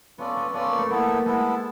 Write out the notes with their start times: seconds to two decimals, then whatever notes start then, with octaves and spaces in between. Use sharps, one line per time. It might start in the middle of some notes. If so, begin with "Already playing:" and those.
0.18 B3 C#4 F4 A4 D5
0.36 B3
0.54 B3 C#4 F4 A4 D5
0.66 A#3
0.78 A3
0.90 A#3 B3 E4 A4
1.08 A3
1.26 G#3 B3 E4 A4